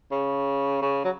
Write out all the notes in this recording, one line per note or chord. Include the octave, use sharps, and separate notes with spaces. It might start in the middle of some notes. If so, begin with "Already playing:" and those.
C#3
C#3
F#3